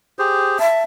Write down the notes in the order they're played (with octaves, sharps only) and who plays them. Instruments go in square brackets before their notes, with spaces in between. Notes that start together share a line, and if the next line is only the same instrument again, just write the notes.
[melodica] G4 G#4 C5
[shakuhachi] E5 [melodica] A5